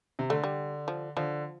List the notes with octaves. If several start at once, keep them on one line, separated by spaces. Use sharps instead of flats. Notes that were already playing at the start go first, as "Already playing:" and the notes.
C3
D3 A3
G3
F3
D3 F3